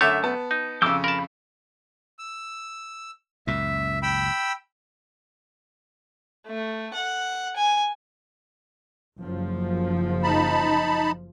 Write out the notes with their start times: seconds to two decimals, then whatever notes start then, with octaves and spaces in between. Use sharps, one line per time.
0.01 F#2 D3 A3 C#5 E5 D6
0.24 B3 A5
0.51 D#4
0.82 F2 C#3 D6 E6 G6
1.04 A#4 A5 B5
2.19 E6
3.47 C#2 F#2 A#2 E5
4.02 G5 B5 E6
6.47 A3
6.93 F#5
7.56 G#5
9.18 F#1 F3
10.23 D#4 A5 B5